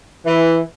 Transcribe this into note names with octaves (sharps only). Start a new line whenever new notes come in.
E3